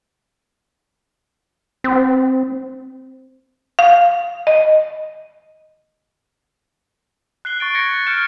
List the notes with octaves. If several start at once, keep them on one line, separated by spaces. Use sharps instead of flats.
C4
F5
D#5
F#6 C7 G7
C#6 A6 D7
G#6 A#6 C7 C#7
F6 G6 A#6 C#7 E7